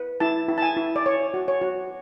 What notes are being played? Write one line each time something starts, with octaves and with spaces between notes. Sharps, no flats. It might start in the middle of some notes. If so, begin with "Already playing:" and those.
Already playing: B4
E4 A5
E4
A5
G#5
E4
D5
C#5
F#4
C#5
F#4